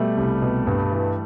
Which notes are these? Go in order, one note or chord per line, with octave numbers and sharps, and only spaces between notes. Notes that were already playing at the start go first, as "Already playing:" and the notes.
Already playing: B2 G3 A3
C2
B2
G2
E3